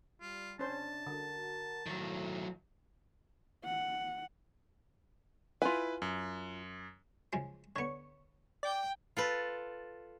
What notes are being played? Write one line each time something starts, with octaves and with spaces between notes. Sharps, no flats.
G3 F4
C3 C#4 D4 C5 A5
D3 F#4 A#4
A2 D#3 F#3
F#5
E4 F4 B4 G#5
F#2
C#3 F3 G#3
D3 B3 C#5 C#6
D5 G5
F4 A4 B4